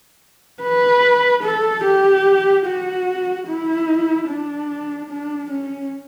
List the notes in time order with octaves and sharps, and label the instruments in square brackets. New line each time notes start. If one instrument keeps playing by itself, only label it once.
[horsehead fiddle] B4
A4
G4
F#4
E4
D4
D4
C#4